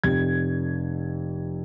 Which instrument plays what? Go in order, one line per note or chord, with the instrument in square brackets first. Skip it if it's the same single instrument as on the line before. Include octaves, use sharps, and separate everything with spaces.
[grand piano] F1 F2 C3 G#6